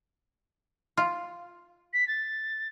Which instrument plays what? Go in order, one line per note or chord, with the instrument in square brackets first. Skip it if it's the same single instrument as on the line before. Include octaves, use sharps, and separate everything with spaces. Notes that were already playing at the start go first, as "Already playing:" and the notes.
[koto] F4
[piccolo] B6
A6